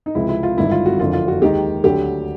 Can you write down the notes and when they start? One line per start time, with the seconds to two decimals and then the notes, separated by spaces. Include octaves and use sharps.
0.06 D#4
0.15 C#2 C3 F3 G#3 E4
0.29 E4
0.43 F4
0.57 G#1 G2 D3 E4
0.71 F4
0.86 F#4
1.00 F#1 F2 D3 F4
1.13 F4
1.28 F#4
1.42 D#2 D#3 G#3 G4
1.84 D2 D3 F#3 G4